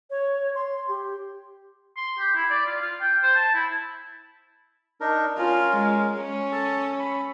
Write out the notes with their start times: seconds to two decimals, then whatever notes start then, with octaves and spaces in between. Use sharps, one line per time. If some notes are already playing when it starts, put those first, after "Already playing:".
0.10 C#5
0.55 C6
0.88 G4
1.97 C6
2.18 G4
2.36 E4
2.50 D5
2.66 F4
2.81 F4
3.01 G5
3.23 C5
3.36 A5
3.54 E4
5.01 D4 D#4 A#4
5.38 C#4 F4 A#4
5.77 G#3
6.21 C#4
6.52 A4 A5
6.99 B5